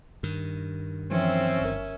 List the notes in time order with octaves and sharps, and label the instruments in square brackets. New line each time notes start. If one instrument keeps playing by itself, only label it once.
[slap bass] G2 D#3
[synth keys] E3 F3 [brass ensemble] C4 [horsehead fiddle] C#4 E5
[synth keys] G1 A#4